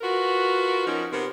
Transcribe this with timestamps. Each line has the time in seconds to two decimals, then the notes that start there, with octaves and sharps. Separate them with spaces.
0.01 F4 F#4 A#4 B4
0.86 F3 C#4 D#4 A#4
1.12 C3 B3 A#4